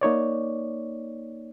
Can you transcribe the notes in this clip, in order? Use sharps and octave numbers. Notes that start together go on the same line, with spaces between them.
A#3 D#4 C#5 D5